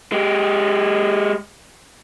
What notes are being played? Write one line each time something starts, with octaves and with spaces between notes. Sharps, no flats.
G#3 G4